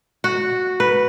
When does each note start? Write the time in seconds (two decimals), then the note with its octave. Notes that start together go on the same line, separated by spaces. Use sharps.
0.24 F#4
0.80 B4